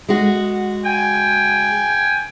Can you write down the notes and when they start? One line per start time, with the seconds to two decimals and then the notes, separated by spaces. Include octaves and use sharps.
0.09 G#3 F#4
0.85 G5 G#5